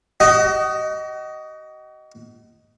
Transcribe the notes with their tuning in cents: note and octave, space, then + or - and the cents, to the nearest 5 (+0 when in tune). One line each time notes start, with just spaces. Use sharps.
F#4 +40 D#5 +0